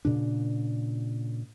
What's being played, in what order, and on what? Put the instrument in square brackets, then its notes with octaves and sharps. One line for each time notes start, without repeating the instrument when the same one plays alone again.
[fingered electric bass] A#2 C#3 D4